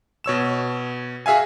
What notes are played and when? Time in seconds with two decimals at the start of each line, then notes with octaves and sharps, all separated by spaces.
0.24 B2 C#5 E6 E7
1.26 F#4 G#4 E5 F5 G#5